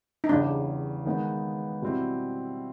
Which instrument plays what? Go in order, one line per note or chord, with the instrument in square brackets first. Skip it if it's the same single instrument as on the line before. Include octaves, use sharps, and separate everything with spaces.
[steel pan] D#4
[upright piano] E2 C#3 E3 G3 [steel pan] D4
[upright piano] D#3 G#3 B3 D#4
B2 G3 C4 E4